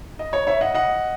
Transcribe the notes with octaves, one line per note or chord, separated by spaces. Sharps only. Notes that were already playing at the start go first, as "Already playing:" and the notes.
D#5
C#5
C#5 E5
D#5 F#5
D#5 F#5